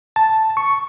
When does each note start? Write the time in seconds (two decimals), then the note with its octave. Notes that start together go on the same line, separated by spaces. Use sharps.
0.16 A5
0.57 C#6